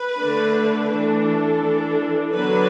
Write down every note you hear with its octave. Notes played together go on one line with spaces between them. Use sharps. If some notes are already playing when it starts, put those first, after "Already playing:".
Already playing: B4
D3 A3 D4
E3 A3 D4 A4
E3 D4
D3 F#3 B3 D4 B4